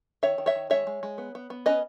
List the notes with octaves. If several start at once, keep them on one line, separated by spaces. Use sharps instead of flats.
D#3 C#5 E5
D#3
C#5 E5
D#3
G#3 C#5 E5
G#3
G#3
B3
B3
B3
C#4 B4 D#5